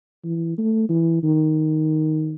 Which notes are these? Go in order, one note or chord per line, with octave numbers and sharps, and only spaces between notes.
E3
A3
E3
D#3